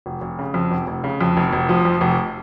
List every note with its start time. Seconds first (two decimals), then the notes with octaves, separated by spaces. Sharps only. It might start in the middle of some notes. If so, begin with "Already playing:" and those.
0.06 F1
0.21 F1
0.39 C#3
0.54 F2
0.71 F1
0.87 F1
1.04 C#3
1.21 F2
1.37 F1
1.53 F1
1.69 F3
1.85 F2
2.01 F1